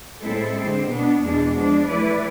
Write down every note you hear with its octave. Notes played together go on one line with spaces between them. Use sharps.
A2 G#3 C4 E4 A4
D3 G#3 C4
B2 B3 D4
E2 B2 G#3 D4
F3 G#3 D4
E3 A3 E4 B4 D5